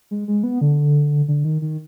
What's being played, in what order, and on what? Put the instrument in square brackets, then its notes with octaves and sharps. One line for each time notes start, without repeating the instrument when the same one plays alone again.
[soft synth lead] G#3
G#3
B3
D3
D3
D#3
D#3